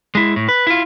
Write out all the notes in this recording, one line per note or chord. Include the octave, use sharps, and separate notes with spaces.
G#3 E4
A2
B4
E4 F4